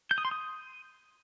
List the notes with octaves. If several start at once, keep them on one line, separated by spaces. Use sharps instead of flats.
G6
D#6
C6
D#6